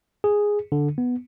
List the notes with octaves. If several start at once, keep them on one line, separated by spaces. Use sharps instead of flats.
G#4
D3
B3